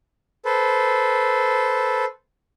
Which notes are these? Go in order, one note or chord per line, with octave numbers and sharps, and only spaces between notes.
A4 B4 C5